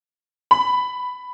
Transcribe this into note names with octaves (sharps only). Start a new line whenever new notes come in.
B5